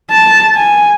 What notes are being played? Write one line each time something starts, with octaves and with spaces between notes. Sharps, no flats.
A5
G#5